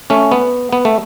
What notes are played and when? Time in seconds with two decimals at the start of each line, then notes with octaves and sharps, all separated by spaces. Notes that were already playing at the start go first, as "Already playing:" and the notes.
0.10 A3 C#4
0.32 B3
0.73 B3
0.85 A3